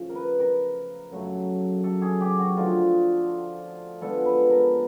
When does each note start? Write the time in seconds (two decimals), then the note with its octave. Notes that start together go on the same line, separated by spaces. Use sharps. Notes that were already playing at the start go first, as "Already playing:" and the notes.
Already playing: C#3 F3 A3
0.09 A#4
0.15 B4
0.39 A#4
1.11 F#2 C#3 F#3 A3
1.84 A4
2.02 G#4
2.21 G4
2.39 F#4
2.57 D3 F3 A3 F4
4.01 D3 F3 G#3 B3 A4
4.26 B4
4.50 A#4